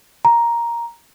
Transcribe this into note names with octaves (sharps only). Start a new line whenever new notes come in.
A#5